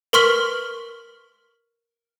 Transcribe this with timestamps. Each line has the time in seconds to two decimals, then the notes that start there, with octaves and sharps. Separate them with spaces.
0.13 A#4 B4 C6 C#6 F6 B6